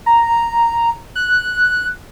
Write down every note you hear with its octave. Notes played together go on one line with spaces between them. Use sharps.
A#5
F#6